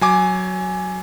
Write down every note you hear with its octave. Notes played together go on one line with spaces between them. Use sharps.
F#3 G#5 D6